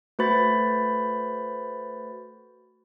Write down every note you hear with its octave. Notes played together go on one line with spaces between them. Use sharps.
A3 F#4 B4 C5 B5 A6